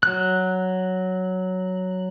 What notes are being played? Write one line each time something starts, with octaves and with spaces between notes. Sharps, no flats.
F#3 F#6